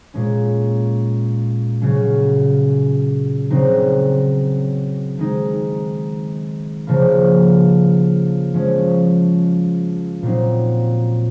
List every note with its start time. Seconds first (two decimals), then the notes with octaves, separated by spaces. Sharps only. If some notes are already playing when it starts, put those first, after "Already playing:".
0.14 A#2 G#3 C#4
1.81 C#3 F#3 C#4
3.50 C#3 F#3 C4 D#4
5.18 D#3 G#3 C4 D#4
6.87 C#3 F3 A#3
8.54 F3 G#3 C#4
10.23 A#2 F#3 C4 D#4